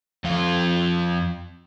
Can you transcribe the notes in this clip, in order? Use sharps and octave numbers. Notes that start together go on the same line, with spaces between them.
F2 F4